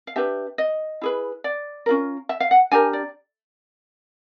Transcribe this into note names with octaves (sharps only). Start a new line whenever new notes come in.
F5
D4 G4 B4 E5
D#5
E4 G#4 B4
D5
C#4 F4 A#4
E5
F5
F#5
D4 G4 A#4 G#5
D5